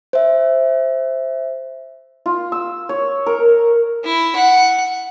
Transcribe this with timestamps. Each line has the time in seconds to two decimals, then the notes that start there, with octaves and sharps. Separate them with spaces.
0.13 C5 E5
2.26 F4
2.52 E6
2.89 C#5
3.26 A#4
4.04 E4
4.36 F#5